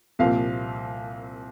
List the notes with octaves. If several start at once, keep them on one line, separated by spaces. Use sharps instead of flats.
C2 A#2 F3 F5